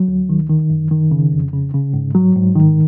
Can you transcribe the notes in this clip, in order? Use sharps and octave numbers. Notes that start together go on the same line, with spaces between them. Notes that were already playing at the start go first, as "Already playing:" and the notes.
Already playing: F#3
D2
D#3
D#3
F#2
D#3
C#3
F2
C#3
C#3
G#2
F#3
G#2
D#3